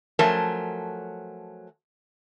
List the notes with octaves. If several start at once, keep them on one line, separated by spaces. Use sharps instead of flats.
F3 F#3 A3 C#4 A#4 A5